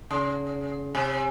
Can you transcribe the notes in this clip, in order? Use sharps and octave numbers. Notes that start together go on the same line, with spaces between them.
C#3
C3